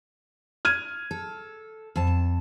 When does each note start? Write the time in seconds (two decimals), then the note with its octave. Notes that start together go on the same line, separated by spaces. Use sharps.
0.65 F6 G#6 D#7
1.11 A4
1.96 F2 A5